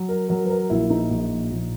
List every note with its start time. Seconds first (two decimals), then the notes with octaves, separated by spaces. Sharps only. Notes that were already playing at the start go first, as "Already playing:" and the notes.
Already playing: F#3
0.09 A#4
0.29 F#3 A#4
0.45 B4
0.50 A#4
0.70 A#1 E4
0.90 D#4
1.11 A#1
1.52 A#1